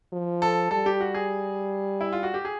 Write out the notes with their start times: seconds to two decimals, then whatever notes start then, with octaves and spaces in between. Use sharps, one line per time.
0.13 F3
0.42 A4
0.71 G3 A4
0.86 G4
1.01 F#4
1.14 G#4
2.01 E4
2.12 F4
2.23 F#4
2.34 G4
2.45 G#4